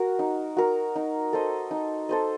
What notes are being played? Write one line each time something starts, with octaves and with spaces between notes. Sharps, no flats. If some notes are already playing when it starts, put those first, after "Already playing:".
Already playing: F#4 A#4
D#4
F#4 A#4
D#4
A4 C5 D#5
D#4
A4 C5 D#5